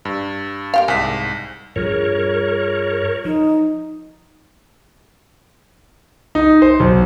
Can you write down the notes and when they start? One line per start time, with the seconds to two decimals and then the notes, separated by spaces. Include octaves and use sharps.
0.05 G2
0.74 A#3 G4 F5
0.88 C2 G#2 G#5 B6
1.76 G2 F3 G3 F4 G#4 A#4 C#5
3.25 F3 D#4
6.35 D#4
6.62 C5
6.80 B1